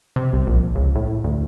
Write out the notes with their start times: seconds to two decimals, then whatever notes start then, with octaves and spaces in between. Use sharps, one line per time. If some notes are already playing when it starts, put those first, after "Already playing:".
0.16 C3
0.33 C2
0.47 A#1
0.75 C#2
0.95 A2
1.24 D2